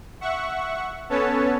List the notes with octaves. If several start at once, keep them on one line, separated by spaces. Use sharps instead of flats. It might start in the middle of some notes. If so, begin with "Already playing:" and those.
E5 F#5 C#6
B3 C#4 A4 B4 C#5 A5